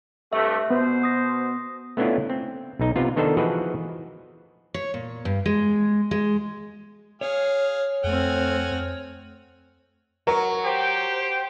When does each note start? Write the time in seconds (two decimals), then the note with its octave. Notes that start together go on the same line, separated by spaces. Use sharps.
0.33 G2 C3 A3 E5 E6
0.70 B2 B3 C5
1.03 D#6 A#6
1.97 A3 B3 C#4 D4 E4 F4
2.30 C4
2.79 B1 D#4
2.96 C3 B3 F4
3.16 D#3 B3 D4 D#4 A4 C5
3.37 E3 F3 F#4 G#4 B4 D#5
4.74 C#5
4.94 A#2
5.25 G2
5.46 G#3
6.11 G#3
7.21 G#4 C#5 F5
8.04 F2 A3 C4 F#5 G#5 F6
10.27 F#3 A#4
10.65 G4 C5 G5